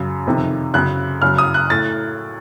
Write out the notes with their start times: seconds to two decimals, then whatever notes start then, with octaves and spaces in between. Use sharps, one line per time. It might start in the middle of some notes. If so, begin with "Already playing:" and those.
Already playing: F#2 C#3
0.26 F2 C3 D#3
0.74 F#2 C#3 F#6
1.22 F#2 C#3 F6
1.38 D#6
1.54 F#6
1.70 A2 A6